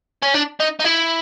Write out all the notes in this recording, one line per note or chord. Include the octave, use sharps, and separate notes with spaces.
C#4
D4
D#4
D#4
E4